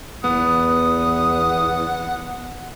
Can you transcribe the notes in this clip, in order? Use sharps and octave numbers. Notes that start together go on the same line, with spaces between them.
E2 B3 F#5 D#6